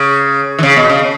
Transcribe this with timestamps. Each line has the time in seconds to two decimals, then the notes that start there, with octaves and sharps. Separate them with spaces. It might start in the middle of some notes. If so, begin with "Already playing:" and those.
Already playing: C#3
0.58 E3
0.63 C#3
0.76 B2
0.90 C#3